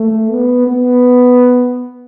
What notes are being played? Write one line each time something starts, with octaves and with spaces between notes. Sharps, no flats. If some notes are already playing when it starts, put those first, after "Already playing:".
Already playing: A3
B3
B3